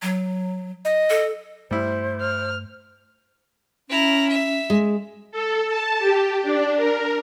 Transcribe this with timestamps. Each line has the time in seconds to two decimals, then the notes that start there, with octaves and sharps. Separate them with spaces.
0.02 F#3
0.85 D#5
1.10 A4
1.71 G2 G3 A3 E4 C5
2.21 F6
3.89 C#4 E4 A#5
4.29 E5
4.70 G#3
5.32 A4
5.66 A5
5.99 G4
6.42 D4
6.76 A#4